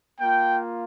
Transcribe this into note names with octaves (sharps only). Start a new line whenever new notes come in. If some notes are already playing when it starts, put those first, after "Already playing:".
A#3 F4 G5